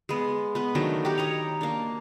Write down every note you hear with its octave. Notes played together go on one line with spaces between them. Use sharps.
G#3 B3
B3 B4
D#3 F#3 A3 D4
G4 A#4 B4 C#5
C#5 D#5 A#5
A#3 D4